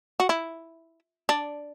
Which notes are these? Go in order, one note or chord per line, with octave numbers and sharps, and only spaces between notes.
F#4
E4
D4